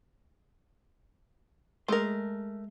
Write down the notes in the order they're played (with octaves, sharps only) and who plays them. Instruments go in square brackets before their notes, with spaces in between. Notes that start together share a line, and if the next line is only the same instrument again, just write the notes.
[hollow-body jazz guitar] G#3 G#4 C6 [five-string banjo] A3 A#4